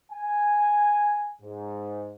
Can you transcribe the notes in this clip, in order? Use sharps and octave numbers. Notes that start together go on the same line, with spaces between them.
G#5
G#2